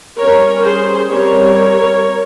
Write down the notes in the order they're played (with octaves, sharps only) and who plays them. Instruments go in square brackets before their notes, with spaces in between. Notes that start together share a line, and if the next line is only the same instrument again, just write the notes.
[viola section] G3 C#4 A#4 C#5
G#4 C5
G3 C4 A#4 C#5